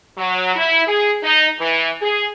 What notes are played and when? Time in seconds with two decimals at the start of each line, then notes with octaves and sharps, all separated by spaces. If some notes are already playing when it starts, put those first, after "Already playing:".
0.17 F#3
0.56 E4
0.87 G#4
1.23 D#4
1.60 E3
2.01 G#4